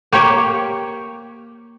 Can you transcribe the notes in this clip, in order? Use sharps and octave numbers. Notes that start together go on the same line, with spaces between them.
A#3 G4 C#5